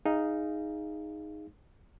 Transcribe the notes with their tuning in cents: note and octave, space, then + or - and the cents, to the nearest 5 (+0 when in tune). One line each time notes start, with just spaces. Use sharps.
D#4 +0 G#4 -5 F5 -20